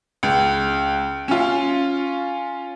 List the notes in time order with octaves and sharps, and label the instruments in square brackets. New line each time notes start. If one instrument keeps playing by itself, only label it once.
[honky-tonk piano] C#2
C#4 F4